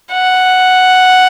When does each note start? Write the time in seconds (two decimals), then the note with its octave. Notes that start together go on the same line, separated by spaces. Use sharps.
0.12 F#5